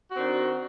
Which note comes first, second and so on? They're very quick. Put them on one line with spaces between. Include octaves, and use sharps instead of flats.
F#4 C4 D#3 D4